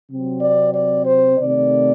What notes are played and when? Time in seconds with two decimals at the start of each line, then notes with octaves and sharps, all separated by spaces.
0.11 C3 F#3 C4
0.42 D5
0.74 D5
1.06 C5
1.38 C3 D#3 A3 D5